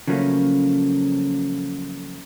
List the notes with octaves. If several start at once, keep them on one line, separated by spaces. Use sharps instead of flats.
C#3 F3 F#3 A3 A#3 C#4